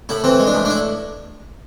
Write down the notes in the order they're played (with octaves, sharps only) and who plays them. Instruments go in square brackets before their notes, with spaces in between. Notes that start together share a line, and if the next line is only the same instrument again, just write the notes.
[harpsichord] A2 E4
E3 C4
G#3
D4
A2
D4
E4